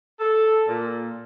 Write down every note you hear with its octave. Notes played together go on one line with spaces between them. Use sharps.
A4
A#2